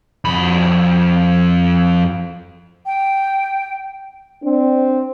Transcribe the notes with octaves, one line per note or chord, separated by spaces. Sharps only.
F2 B5
G5
C4 D4